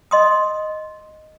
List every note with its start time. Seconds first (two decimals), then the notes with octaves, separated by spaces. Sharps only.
0.11 D#5 C6 D#6